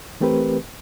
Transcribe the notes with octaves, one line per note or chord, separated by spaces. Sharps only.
E3 A3 C4 G4 A#4 B4